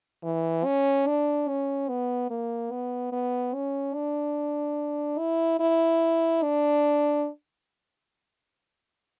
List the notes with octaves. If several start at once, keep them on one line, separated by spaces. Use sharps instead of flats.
E3
C#4
D4
C#4
B3
A#3
B3
B3
C#4
D4
E4
E4
D4